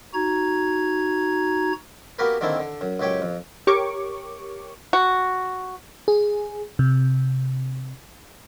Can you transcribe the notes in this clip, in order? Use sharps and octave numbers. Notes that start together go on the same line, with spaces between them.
D#4 F#4 A#5 G#6
A#3 B3 F#4 G4 A#4 B4
D3 D#3 A#3 C4 D4 E4
D3
F#2
C#2 F#2 G4 C#5 G5
F2
G4 A#4 C#5 C#6 D6
F#4
G#4
C3